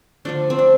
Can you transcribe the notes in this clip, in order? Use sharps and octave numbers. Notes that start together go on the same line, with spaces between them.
D3 F3 A3 D4
C4
D4